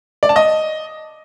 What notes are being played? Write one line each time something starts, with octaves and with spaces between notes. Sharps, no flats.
D5
A5
D#5